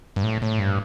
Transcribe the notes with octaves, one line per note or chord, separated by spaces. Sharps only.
G2
A2
A2
G2